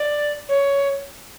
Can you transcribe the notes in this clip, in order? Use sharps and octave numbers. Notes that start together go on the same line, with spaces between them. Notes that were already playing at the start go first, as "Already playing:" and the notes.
Already playing: D5
C#5